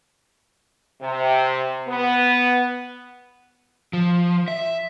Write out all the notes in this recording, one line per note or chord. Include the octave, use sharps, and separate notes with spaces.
C3
B3
F3
E5